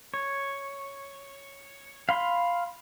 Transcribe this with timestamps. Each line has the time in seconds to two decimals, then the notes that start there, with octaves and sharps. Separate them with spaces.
0.14 C#5
2.09 F5 B5 C6